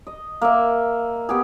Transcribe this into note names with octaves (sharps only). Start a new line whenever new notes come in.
D#5
A#3 E5
B3 G4 G#4